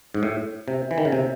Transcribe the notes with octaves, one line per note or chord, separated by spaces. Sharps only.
G#2
A2
C3
E3
D#3
C#3
C3